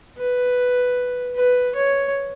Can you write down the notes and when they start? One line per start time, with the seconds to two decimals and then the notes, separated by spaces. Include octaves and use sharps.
0.18 B4
1.36 B4
1.75 C#5